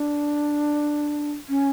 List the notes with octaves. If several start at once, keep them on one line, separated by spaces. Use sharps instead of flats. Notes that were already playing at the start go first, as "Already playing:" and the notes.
Already playing: D4
C#4